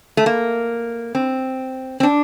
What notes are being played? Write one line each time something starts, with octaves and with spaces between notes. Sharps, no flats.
A3
A#3
C4
C4
D4